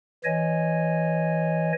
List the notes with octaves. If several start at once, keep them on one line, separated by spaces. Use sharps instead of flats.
E3 C#5 D#5 G#5